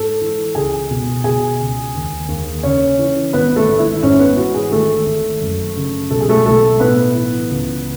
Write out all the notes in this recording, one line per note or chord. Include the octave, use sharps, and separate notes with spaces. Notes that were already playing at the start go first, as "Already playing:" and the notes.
Already playing: G#2 A4 A5
E3
C#2 G#4 G#5
B2
B2 G#4 G#5
C#2
D#2
D#2
C#3 C#4 C#5
E3
G#1 B3 B4
A3 A4
G#1
E4 E5
G#2 C#4 C#5
B3 B4
E3 F#4
G#4
G#1 A3 A4
G#1
F#2
C#3
B1 A4
G#4
A3 A4
B1 A3 A4
A2 B3 B4
E3
C#2